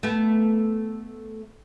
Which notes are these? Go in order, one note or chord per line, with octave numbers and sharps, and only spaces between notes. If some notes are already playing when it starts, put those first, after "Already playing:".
A3 B3